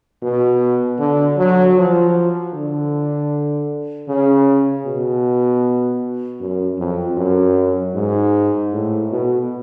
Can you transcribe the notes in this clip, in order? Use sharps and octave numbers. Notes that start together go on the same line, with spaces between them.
B2
D3
F#3
F3
D3
C#3
B2
F#2
F2
F#2
G#2
A2
B2